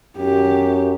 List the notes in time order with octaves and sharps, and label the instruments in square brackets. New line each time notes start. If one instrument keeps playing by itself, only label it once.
[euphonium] F#2 [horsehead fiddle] G4